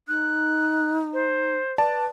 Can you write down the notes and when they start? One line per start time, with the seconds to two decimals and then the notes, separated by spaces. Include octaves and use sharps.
0.08 D#4 F#6
1.13 C5
1.78 B4 D5 A5